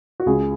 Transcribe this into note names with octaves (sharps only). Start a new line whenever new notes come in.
F#4
C#2 G#4